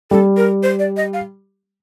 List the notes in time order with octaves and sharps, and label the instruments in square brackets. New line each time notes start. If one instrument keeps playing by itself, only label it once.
[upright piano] G3 [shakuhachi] A4
[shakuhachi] A#4
C5
D5
D#5
F5